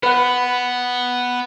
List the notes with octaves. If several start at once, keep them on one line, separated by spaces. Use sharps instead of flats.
B3 B4 F#5